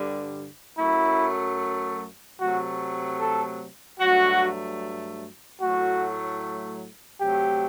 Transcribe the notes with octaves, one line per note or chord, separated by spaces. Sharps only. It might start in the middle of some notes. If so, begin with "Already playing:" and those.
Already playing: G2 D3 G3
F#2 F#3 A3 E4
C3 F#3 A3 F#4
A4
G2 F#3 A3 F#4
A2 F#3 A3 F#4
C3 F#3 A3 G4